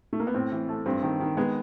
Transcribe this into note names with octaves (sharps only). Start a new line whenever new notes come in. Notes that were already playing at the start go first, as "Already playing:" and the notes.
A3
A#3
B3
A2 C4
E3
A3
G2 C4
D#3
D#3
G#3 B3